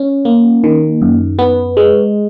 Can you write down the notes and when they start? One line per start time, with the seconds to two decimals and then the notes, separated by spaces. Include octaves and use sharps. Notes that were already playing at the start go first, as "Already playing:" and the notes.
Already playing: C#4
0.25 A#3
0.64 D#3
1.02 F#2
1.39 B3
1.77 G#3